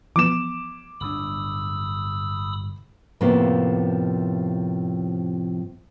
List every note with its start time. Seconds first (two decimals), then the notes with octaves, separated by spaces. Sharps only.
0.16 E3 F3 B3 D6 E7
1.01 G1 A2 D4 B5 D#6 E6
3.21 F2 A2 C3 F3 A#3 B3